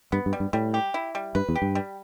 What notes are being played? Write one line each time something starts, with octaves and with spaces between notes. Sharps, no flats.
G2 B3
G2
G3
G2
A2 G3
G4
E4
G3
G2 B4
E2
G4
G2
G3